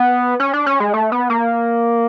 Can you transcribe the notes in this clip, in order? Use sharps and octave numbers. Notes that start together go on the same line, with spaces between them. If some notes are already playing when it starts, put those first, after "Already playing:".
Already playing: B3
C#4
D4
C#4
G#3
A3
B3
A#3